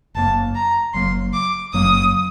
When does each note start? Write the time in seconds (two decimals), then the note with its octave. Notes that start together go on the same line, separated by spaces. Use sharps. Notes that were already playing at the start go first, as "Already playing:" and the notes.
0.15 F#1 F#2 F#3 A#3 A5
0.56 A#5
0.94 F#1 F#2 F#3 A#3 C6
1.34 D6
1.74 F#1 F#2 F#3 A#3 D#6